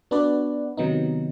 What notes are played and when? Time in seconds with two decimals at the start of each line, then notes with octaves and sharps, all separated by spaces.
0.11 B3 D4 F#4 B4 D5
0.77 C3 D#3 F#3 B3 D#4